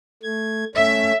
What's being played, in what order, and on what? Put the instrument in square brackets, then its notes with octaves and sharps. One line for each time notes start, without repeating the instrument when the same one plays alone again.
[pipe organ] A3 G#6
[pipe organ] A3 C#4 [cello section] E5